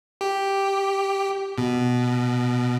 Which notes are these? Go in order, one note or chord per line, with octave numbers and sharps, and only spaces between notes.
G4
B2